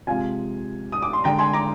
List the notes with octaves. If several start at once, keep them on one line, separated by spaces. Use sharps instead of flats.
C3 F3 G#3 F5 G#5
D#6
D6
C6
D3 G#3 G5 A#5
G#5 C6
A#5 D6